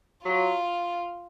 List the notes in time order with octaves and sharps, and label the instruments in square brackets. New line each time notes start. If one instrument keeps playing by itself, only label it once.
[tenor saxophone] F#3 [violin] F4